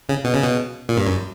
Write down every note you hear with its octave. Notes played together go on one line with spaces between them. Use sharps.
C#3
B2
C#3
B2
A#2
G2
F#2